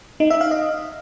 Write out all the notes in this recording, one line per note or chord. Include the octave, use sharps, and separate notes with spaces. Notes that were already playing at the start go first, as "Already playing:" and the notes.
D#4
E5
F5
D#5